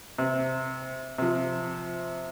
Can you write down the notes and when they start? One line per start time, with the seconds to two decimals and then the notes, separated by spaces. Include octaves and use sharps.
0.18 C3
1.18 C3 F3